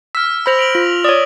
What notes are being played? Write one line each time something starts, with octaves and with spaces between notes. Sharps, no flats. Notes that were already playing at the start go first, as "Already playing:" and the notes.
E6 F6 B6
C5 B5 E6 A#6 F7
D7 F7 F#7
F4
C#5 D5 D#6